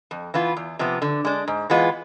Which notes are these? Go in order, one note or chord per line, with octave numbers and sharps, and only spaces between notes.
F2
E3 B3 F4
E2
C3 F3 B3
D3
G#3 D4
G#2
E3 G#3 B3 F4